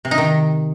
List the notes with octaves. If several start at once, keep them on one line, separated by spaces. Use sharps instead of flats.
C3
D#4
D#3